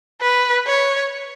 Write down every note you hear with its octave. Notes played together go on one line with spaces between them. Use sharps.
B4
C#5